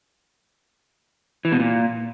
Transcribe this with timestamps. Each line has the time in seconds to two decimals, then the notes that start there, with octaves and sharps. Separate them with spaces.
1.45 E3
1.52 B2
1.60 A#2